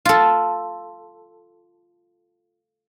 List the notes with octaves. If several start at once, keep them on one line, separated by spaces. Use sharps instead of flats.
F4 A4